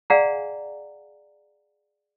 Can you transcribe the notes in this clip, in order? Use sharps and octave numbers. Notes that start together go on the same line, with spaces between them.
G#4 D5 F5 F#5 G#5 A#5